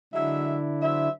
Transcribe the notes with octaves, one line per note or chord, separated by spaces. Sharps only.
D3 F#3 G#3 D4 E4 E5
F#3 C5 E5